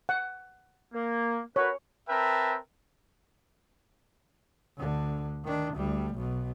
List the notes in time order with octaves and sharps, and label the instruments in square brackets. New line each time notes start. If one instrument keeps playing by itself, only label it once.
[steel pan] F#5
[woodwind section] A#3
[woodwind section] F#4 A#4 B4 [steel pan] C#5
[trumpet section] C4 A#4 B4 E5 G5 A5
[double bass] D2 D3
D#3 D4
D2 G3
B1 B2